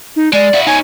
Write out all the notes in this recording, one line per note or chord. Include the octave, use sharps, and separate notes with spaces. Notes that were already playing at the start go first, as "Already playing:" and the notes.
D#4
G#3 D5
E4 F#4
D#4 C#5 G#5